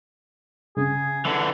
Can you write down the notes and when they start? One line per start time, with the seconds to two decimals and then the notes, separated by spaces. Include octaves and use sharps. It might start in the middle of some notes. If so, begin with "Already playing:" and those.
0.77 C#3 G#4
1.25 D3 E3